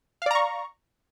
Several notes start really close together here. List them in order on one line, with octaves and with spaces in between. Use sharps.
F5 D5 A#5 C#6